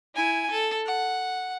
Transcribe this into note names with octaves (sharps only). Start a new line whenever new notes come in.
E4 G#5
A4
F#5